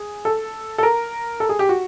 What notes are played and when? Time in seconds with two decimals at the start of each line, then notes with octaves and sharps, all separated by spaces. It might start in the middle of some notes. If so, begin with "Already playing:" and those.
Already playing: G#4
0.25 A4
0.78 A4
0.83 A#4
1.40 A4
1.49 G#4
1.59 G4
1.69 F#4